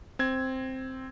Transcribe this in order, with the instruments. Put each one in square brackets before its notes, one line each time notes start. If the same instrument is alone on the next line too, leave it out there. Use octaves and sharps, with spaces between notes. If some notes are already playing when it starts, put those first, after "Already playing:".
[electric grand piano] C4 G#6